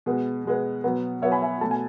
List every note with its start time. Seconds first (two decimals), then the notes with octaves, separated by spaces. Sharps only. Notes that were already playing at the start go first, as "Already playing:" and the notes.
0.06 B2 G#3 B3
0.45 B2 G#3 B3
0.84 B2 F#3 B3
1.22 B2 F#3 B3 C#5 E5
1.32 G#5 B5
1.42 E5 G#5
1.61 B2 A3 A5
1.71 G#5